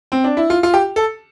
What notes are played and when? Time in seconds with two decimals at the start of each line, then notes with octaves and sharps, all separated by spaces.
0.12 C4
0.24 D4
0.37 E4
0.50 F4
0.63 F4
0.74 G4
0.96 A4